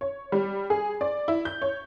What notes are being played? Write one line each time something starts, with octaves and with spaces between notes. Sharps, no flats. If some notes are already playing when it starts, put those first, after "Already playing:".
C#5
G3
G#4
D5
E4
G6
C#5